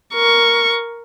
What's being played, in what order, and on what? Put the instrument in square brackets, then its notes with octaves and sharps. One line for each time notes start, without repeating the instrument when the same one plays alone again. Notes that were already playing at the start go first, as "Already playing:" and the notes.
[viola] A#4 C#6